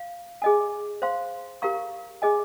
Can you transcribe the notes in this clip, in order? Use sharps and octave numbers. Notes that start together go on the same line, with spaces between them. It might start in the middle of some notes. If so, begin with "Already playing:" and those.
Already playing: F5
G#4 D#5 G#5
C5 F5 C6
G4 A#4 F5 A#5 C#6
G#4 D#5 G#5